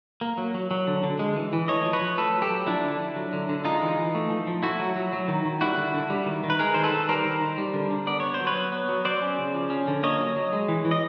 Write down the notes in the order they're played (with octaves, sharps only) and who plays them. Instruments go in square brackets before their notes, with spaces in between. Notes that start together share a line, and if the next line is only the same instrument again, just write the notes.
[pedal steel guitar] A#3
F#3
F#3
F#3
D3
D3
G#3
E3
E3
A3 C#5 D#5
F3
B4 C#5
F3
A3 A4 B4
F#3
G4 A4
F#3
F3 D4 E4
D3
D3
F#3
D3
D3
G#3 D#4 F4
E3
E3
A3
F3
F3
A3 E4 F#4
F#3
F#3
F#3
D#3
D#3
G3 E4 F#4
D3
D3
G3
D#3
D#3
B4
G#3 G#4 A#4
D#3 C5
A4 B4
D#3
G3 A#4 C5
D#3
D#3
G3
D3
D3
B3 D5
B3 C#5
C5
F#3
B4 C#5
B3
B3
F#3
F#3 C5 D5
C#4
C#3
F3
C#4
D3
A#3 C#5 D#5
F#3
F#3
G#3
E3
E3
D#5